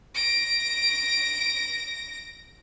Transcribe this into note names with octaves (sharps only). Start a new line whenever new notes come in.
A#6 D7